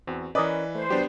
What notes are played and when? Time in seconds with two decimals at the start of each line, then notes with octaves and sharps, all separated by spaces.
0.07 E2 C4 F#4
0.35 E3 C#4 A#4 B4 D5 D#5
0.75 A3 C5
0.90 F#3 B3 D4 G4